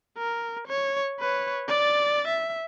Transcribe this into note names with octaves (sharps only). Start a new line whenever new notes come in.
A#4
C#5
B4 C#5
D5 A6
E5